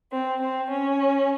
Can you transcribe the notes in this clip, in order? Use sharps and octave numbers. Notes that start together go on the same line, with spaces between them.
C4
C4
C#4